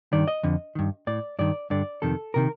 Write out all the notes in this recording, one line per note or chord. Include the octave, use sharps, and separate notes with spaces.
G2 D#3 D5
D#5
F2 D3
G2 D#3
A2 D5
G2 D#3 D5
G2 D3 D5
F2 C3 D#3 A4
C3 D#3 A#4